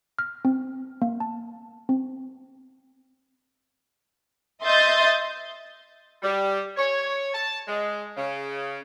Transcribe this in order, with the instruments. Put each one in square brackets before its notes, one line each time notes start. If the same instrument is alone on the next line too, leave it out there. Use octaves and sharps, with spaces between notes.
[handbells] F6
C4
A#3
A5
C4
[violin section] D#5 E5 C6 D#6 G6 A6
[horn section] G3
C#5
A5
G#3
C#3